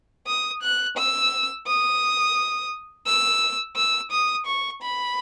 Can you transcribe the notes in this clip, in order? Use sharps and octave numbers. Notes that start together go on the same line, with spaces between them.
D#6
F#6
E6
D#6
E6
E6
D#6
C#6
B5